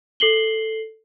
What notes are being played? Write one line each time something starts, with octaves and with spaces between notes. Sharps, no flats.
A4 C7 F#7 G7